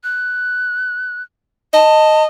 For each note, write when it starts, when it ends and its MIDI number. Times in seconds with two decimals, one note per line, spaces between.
0.04 1.22 90
1.74 2.26 75
1.74 2.23 81